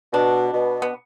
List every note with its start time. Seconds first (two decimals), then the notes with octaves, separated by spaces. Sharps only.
0.13 B2 D4
0.53 B2
0.82 B3